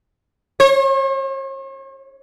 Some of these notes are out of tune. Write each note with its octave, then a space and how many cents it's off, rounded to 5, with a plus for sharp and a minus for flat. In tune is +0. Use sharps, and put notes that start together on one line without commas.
C#5 -45